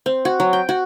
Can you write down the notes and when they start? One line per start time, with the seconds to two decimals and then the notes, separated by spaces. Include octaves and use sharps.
0.06 C4
0.25 F#4
0.40 F#3
0.53 G5
0.69 F#4